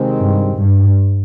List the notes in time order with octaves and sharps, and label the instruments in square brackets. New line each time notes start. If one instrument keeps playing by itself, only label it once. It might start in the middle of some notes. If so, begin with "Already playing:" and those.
Already playing: [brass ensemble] C3 D#3 G#3 C4
[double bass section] G2
G2